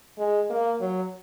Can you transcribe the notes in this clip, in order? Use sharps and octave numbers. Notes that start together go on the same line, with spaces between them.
G#3
A#3
F#3